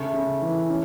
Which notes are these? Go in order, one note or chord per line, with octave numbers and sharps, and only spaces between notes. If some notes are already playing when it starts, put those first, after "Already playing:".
Already playing: C#3 A3
C#3
E3
C#4